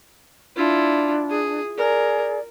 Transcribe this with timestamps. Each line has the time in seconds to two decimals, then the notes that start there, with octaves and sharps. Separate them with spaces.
0.56 D4 E4 F4
1.30 G#4
1.77 G#4 A#4 D5